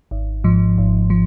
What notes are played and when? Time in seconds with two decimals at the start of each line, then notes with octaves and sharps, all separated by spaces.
0.11 G#1
0.44 G#2 F3
0.78 G#1
1.10 F3